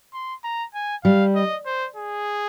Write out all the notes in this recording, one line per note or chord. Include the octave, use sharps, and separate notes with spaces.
C6
A#5
G#5
G3 F5
D#5
C5
G#4